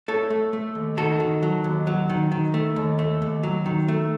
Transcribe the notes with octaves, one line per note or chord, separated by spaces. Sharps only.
A3 A4 C#5
A3
A3
D#2
D#3 F#4 A4
D#3
F#3
D#2
F#3
D#3
D#3
A3
D#2
A3
D#2
F#3
D#3
A3